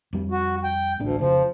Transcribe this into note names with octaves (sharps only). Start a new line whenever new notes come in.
F2 G3
F#4
G5
A1 D2 B3 D4
F1 C#3 F3